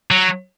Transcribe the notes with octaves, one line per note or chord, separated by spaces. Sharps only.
F#3